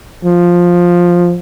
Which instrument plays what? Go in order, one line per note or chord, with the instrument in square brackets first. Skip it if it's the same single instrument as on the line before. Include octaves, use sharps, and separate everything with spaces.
[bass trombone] F3